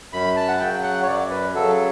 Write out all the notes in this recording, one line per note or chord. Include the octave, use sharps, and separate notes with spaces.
F#2 B5
A5
F#5
C#3 F#3 G5
F#5
C#5
F#2 D5
B4
C#3 F#3 A4